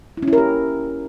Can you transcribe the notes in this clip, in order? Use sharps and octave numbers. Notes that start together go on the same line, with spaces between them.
E4
C#4
E4
A#4
G4